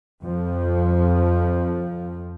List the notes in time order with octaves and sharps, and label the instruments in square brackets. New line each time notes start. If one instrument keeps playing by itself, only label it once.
[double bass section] F2 F3